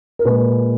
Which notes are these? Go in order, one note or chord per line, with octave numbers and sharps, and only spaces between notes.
A#4
A#2 G#3 B4